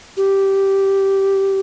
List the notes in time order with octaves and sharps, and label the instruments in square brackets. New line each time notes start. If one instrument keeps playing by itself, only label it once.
[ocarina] G4